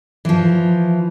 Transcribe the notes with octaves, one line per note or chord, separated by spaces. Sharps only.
E3 F3